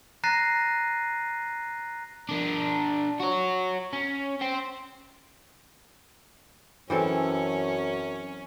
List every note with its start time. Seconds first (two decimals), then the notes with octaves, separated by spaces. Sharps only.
0.24 A#5 F#6 A6 A#6 C7 D#7
2.29 D4 A#4
3.20 F#4 C#5
3.93 C#4
4.41 C5 G5
6.90 F#2 E3 C4 C#4 A4